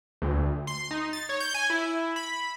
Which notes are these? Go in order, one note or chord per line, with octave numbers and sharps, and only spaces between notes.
D2
C6
D#4
A6
C#5
G6
G#5
E4
B5